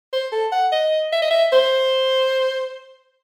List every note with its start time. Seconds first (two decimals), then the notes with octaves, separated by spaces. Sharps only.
0.13 C5
0.32 A4
0.52 F#5
0.72 D#5
1.12 E5
1.22 D#5
1.31 E5
1.53 C5